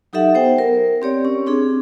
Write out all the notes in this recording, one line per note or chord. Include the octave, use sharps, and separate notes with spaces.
F#3 D#4 G4 A4 E5 F#5
B3 C5 G5
A#4
C4 G4 C#5 D5
C#4
C4 D4 G#4